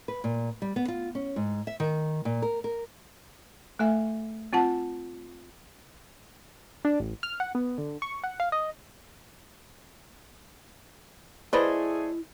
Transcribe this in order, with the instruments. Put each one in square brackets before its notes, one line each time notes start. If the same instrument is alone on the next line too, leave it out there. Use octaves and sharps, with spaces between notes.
[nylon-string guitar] B4
A#2
G3
B3
F4
C#4
G#2
E5
D#3
A#2
A#4
A#4
[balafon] A3 A4 E5 G#5
C4 F4 F#5 A5
[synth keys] D4
A1
F6
F#5
B3
D3
C#6
F#5
F5
D#5
[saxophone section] A3 G#4 [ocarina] E4 [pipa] B4 D#5 [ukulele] C5 D5